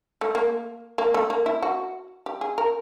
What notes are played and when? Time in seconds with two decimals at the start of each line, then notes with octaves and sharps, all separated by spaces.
0.21 A3
0.35 A#3
0.98 A#3
1.14 A3
1.30 A#3
1.46 E4
1.62 F#4
2.26 G4
2.41 G#4
2.58 A#4